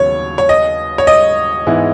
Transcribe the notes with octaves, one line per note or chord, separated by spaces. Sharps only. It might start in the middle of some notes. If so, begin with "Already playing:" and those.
Already playing: D#2 C#3 F#3 B3 C#5
C#5
D#5
C#5
D#5
G#2 E3 G#3 B3 E4